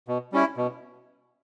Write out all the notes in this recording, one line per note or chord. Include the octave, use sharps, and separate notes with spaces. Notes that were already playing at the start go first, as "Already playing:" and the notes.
B2
G3 C#4 E4
B2